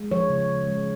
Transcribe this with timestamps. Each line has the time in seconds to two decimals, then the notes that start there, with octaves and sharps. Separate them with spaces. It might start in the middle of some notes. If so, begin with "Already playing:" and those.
Already playing: G#3
0.11 F3 C#5
0.30 C#3
0.49 C#3
0.67 G#3